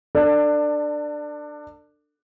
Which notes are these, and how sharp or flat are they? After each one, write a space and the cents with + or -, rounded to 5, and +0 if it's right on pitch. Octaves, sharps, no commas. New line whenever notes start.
D4 +15 A4 +35